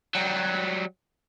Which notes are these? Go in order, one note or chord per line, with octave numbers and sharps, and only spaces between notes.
F#3 G3